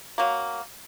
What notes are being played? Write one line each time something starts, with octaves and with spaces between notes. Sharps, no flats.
F#3 A#3